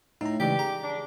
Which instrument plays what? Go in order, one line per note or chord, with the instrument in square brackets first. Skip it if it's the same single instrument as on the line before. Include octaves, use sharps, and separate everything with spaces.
[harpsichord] A2 [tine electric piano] D#4 A#5
[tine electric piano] C#3 E3 G#3 [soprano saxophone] G4 [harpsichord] D5
[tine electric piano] G#4 [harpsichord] A#5
[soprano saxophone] D4